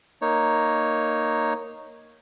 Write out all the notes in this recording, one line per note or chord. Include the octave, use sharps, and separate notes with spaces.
A#3 D#4 C#5